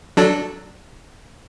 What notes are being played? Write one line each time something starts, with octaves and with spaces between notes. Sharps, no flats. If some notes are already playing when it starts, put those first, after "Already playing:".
F#3 D4 A4